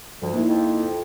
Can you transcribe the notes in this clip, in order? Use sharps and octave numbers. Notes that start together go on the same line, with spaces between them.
D2 G2 F3
A#3 D#4 E4
F2